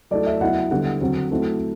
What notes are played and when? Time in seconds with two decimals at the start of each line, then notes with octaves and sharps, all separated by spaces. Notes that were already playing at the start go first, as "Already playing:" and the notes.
0.11 F#3 A3 E4 D5
0.26 E5
0.41 F#3 B3 E4 F#5
0.71 D3 G3 B3 E4 F#5
1.01 D3 F#3 C4
1.31 F#3 A3 C4 E4